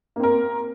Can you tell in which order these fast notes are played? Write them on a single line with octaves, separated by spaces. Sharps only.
A#3 C4 A#4